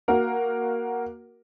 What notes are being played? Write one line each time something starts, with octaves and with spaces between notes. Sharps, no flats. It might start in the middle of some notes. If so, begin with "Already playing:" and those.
A#3 F#4 A#4